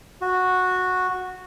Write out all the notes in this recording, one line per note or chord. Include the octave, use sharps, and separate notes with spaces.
F#4